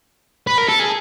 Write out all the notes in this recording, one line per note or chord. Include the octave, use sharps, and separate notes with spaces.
B4
A#4
A4
G#4